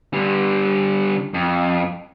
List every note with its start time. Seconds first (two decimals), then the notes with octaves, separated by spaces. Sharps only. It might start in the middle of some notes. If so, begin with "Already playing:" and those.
0.13 D3 G3
1.34 F2